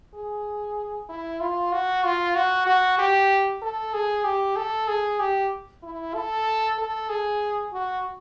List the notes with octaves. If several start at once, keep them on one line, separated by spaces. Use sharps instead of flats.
G#4
E4
F4
F#4
F4
F#4
F#4
G4
A4
G#4
G4
A4
G#4
G4
E4
A4
A4
G#4
F#4